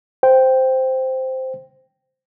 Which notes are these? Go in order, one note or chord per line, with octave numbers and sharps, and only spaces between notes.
C5 G5